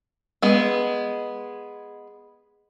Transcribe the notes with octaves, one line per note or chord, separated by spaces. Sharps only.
G#3 B3